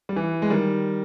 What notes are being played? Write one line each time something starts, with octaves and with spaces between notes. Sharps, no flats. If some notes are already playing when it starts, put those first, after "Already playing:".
G3
E3
G#3
D#3 G3